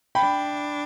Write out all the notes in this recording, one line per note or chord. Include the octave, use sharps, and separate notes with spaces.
D4 G5 B5